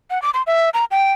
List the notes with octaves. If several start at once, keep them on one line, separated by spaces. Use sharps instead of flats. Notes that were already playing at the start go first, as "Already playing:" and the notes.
F#5
D6
C6
E5
A#5
G5